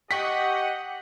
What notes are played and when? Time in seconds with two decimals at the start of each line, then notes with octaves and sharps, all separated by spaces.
0.11 G4 D#5 F#5 G5 C#6 B6